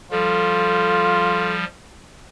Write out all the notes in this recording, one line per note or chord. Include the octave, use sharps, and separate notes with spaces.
F3 G3 F4 A4